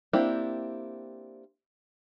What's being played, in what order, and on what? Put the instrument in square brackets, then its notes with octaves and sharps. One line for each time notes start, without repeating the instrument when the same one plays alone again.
[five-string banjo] A#3 C4 D4 E4 G4